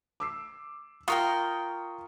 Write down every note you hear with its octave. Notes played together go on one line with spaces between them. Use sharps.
D6 E6 C7
F4 A#4 G5 C#6 D#6 C#7